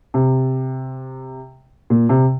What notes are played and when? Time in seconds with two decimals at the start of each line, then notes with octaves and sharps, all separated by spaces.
0.14 C3
1.90 A#2
2.09 C3